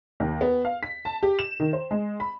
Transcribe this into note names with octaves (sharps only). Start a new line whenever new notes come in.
D#2
B3
F5
B6
A5
G4
E7
D#3
C5
G#3
B5